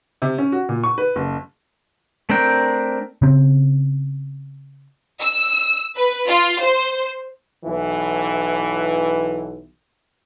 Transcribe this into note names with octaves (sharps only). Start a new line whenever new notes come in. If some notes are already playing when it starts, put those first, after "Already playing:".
C3
C#4
F#4
A#2
C#6
B4
F#1
A3 C4 D4 A#4 G5
C#3 C4
E6
B4
F4
C5
B1 E3